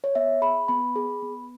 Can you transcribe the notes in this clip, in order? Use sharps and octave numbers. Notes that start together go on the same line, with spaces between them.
C#5
B3 E5
G#4 B5
B3 B5
G#4
B3